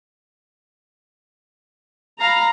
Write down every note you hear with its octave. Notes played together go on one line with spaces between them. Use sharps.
F5 A#5 B5